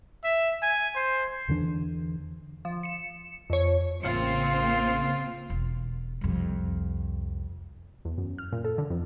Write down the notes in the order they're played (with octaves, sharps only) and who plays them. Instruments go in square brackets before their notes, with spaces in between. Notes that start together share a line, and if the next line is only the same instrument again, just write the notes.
[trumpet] E5
G#5
C5
[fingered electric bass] E2 D3 E3 D4
[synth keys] F3
C#7 E7
F2 C#5
[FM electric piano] A1 F5 C#7 [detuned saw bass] C#3 [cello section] A#3 C4 [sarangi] F4
[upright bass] E1
C2 F2
[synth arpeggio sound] E2
F#2
F6
A#2
A4
D3
F2